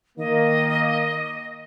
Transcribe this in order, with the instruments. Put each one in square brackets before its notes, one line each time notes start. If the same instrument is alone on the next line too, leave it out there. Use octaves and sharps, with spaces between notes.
[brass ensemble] D#3 A#3 [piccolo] D#5